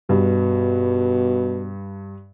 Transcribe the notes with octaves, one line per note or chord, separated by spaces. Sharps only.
G2 B2